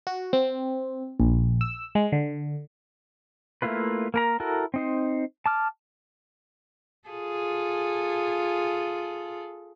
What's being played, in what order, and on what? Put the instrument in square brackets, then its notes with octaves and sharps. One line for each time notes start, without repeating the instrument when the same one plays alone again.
[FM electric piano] F#4
C4
A#1
E6
G#3
D3
[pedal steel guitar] A3 A#3 E4 F4 B4
A#3 A#4 A#5
E4 F#4 A4 A#4
C4 D#4 C5
A5 D6 F6
[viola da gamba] F4 G#4 A4